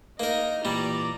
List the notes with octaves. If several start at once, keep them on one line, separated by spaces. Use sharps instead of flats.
A#3 D#4 A#4 D#5
A#2 E3 G3 D5 A#5